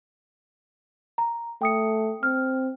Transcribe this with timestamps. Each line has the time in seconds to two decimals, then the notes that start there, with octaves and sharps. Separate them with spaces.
1.18 A#5
1.62 A3 G5 D#6 C#7
2.23 C4 F6